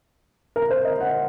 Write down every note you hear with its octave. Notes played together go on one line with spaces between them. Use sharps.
A#4
C5
D#5
F#5